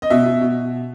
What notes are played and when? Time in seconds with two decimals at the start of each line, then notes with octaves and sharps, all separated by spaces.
0.02 D#5
0.10 B2 E5
0.26 B2
0.41 B2